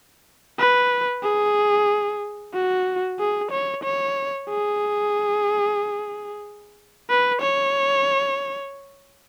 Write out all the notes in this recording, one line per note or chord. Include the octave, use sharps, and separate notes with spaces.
B4
G#4
F#4
G#4
C#5
C#5
G#4
B4
C#5